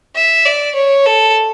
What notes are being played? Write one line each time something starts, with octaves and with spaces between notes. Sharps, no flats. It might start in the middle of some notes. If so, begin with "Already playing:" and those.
E5
D5
C#5
A4